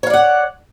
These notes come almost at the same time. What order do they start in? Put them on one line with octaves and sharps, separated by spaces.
C#5 F5 D5 F#5